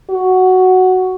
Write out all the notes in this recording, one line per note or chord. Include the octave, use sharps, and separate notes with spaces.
F#4